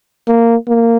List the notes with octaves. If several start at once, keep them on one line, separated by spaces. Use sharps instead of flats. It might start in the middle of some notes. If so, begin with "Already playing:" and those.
A#3
A#3